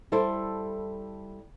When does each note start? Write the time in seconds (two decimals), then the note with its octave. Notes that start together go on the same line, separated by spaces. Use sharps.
0.12 G3 E4 A4 C5